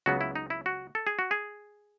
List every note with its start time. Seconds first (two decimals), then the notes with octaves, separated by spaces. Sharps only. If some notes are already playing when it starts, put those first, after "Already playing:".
0.06 C#2 C#3 F#3 B3 F#4
0.21 E4
0.36 D#4
0.50 E4
0.66 F#4
0.95 A4
1.07 G#4
1.19 F#4
1.31 G#4